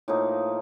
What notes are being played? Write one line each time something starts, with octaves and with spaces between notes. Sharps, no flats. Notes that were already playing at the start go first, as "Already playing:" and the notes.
A2 F3 A#3 D#4